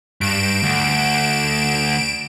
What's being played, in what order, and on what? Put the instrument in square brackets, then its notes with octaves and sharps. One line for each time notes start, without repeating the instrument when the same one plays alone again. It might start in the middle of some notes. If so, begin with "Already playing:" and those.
[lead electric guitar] G2 [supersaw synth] D7 E7
[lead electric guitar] D2